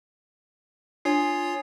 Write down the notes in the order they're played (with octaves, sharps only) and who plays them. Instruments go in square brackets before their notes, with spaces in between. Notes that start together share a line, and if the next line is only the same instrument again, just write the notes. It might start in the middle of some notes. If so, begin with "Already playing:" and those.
[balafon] D4 [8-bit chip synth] F4 C#5 [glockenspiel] G#5 D#6 C7